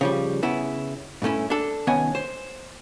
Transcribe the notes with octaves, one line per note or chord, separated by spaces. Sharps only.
C#3 F3 G3
C#3 B3 E4
G2 A#2 A3 C#4 E4
D4 A4
C2 D#3 B3 C#4 D#5 G#5
C5